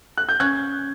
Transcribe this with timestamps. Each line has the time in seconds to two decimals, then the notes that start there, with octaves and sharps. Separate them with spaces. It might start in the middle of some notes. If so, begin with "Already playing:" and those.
0.18 F#6
0.29 G6
0.40 C#4 F#6 G#6